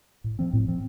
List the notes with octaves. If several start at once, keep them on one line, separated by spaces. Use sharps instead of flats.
A2
F3 C4
A2
F3 C4